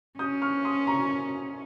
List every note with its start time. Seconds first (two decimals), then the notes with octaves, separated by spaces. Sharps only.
0.19 C#4 D#6 G6
0.42 C#6 F6
0.64 C6 D#6
0.87 A#5 C#6